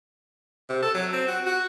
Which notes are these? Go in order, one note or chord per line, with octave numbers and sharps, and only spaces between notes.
C3
A4
F#3
C4
F#4
F#4